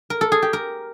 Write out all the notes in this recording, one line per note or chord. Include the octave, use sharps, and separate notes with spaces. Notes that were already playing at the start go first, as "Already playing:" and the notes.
A#4
A4
G#4
G4
A#4